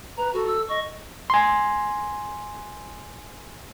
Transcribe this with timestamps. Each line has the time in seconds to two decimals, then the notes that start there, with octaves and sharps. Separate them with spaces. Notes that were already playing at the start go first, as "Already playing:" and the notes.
0.17 B4 A#5
0.33 F#4 A4
0.47 E6
0.68 D#5 C#6
1.30 G#5 C6